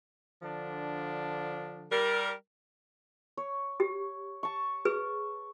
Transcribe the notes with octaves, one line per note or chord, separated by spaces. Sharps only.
D3 F3 D4
G3 A#4
C#5
G4
A5 C#6
G#4 B4